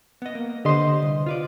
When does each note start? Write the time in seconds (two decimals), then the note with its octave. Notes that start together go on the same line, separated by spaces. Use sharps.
0.22 B3 D#5
0.35 A#3
0.65 D3 G4 B4 C5 D#5 C6
1.02 C2
1.26 F4 B4 D5